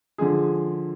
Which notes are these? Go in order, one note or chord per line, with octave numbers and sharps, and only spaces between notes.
D3 F3 G#3 G#4